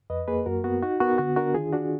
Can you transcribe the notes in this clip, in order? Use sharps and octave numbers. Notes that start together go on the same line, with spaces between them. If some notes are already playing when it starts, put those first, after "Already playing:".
F2 B4 D#5
A#3 G#4 B4
F#2 F#4 A#4
B3 F#4
D#4 F#4
B3 F#4 A#4
D3 F#4
D4 F#4 A#4
D#3 F4 G#4
D4 F#4